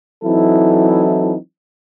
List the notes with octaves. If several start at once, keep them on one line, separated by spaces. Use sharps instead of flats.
E3 F#3 C4 D#4 E4 A4